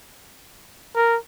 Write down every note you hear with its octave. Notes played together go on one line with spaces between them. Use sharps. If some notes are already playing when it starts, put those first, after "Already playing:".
A#4